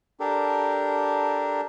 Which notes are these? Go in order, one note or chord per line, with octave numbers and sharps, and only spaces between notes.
D4 G4 A4 A#4